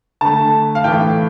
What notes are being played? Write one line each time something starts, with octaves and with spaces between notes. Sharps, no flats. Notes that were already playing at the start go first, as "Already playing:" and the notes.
D3 A3 A5
F5
A2 E3 A3 G5